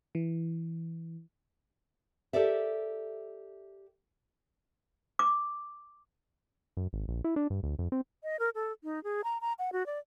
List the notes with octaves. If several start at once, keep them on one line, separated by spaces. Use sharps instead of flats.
E3
G4 A4 A#4 D5 E5
D6
F#2
G#1
A#1
E4
D4
G2
D2
F2
C4
D#5
A#4
A4
D#4
G#4
A#5
A#5
F#5
F#4
D5